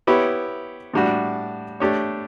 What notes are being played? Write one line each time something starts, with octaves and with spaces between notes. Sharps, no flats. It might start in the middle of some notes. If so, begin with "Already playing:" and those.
B3 E4 G4 C#5
A2 G3 D4 F#4
A3 D4 G4 C#5